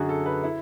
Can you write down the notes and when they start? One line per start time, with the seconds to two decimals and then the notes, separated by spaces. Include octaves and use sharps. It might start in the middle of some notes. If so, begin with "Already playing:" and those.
Already playing: F#2 D3 F#4 G#4
0.09 A4
0.26 B4
0.43 E4